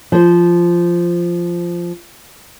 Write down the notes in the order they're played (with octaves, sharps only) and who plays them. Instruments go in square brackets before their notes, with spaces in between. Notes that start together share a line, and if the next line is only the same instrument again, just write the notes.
[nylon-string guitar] F3 C5